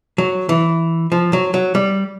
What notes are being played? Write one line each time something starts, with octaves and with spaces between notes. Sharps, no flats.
F#3
E3
F3
F#3
F#3
G3